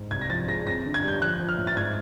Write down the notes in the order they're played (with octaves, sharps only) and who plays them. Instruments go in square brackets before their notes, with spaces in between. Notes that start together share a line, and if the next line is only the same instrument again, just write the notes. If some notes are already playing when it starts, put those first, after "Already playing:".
Already playing: [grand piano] G#2
C2 G#6
A#6
F3 A6
G#3 A#6
F2 A#6
D3
G#6
G3 G6
F3 F#6
F3
F6
A2
A6
G#2 G#6